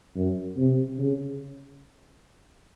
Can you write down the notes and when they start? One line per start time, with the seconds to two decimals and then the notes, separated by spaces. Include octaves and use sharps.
0.16 F#2
0.57 C3
0.98 C#3